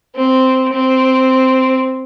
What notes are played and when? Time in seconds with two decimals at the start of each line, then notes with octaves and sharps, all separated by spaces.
0.15 C4
0.73 C4